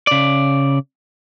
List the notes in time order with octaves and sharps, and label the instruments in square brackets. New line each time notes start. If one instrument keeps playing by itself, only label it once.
[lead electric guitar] C#3 D5